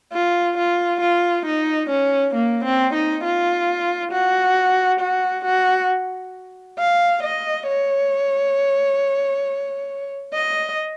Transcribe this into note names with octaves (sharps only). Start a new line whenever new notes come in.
F4
F4
F4
D#4
C#4
A#3
C4
D#4
F4
F#4
F#4
F#4
F5
D#5
C#5
D#5